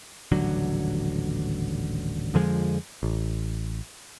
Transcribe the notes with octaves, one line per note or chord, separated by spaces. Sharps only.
D#1 A1 D3 F#3
F2 D3 F3 G#3
A1